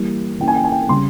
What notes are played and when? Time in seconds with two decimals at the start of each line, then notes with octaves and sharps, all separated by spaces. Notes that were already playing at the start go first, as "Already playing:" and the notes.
Already playing: E3 G3 A#3
0.40 E3 A#3 C#4 G5
0.48 G#5
0.56 G5
0.64 G#5
0.72 G5
0.89 C#3 G3 C#4 C6